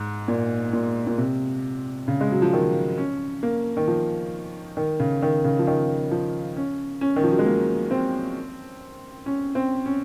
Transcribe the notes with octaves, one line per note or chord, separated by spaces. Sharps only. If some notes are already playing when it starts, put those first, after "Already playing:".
Already playing: G#2
A#2
A#2
A#2
C3
C#3
G#3
F#3
F3
D#3
C#4
A#3
D#3
F3
D#3
C#3
D#3
C#3
F3
D#3
F3
C#4
C#4
D#3
F3
F#3
G#3
A#3
C4
C#4
C4
C#4